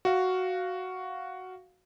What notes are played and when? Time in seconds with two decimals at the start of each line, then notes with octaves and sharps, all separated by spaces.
0.05 F#4 F5